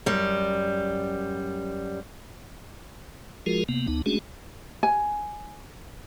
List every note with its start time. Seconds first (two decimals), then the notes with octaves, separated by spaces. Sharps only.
0.06 F#2 G3
3.46 F3 G#3 F4 F#4 G#4 A#4
3.69 C3 A#3 B3
3.88 D2 B3 D#4
4.06 G#3 A3 C#4 D4 F#4 G#4
4.83 G#5